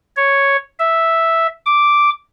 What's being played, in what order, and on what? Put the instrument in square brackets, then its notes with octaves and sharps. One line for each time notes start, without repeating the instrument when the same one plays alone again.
[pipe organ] C#5
E5
D6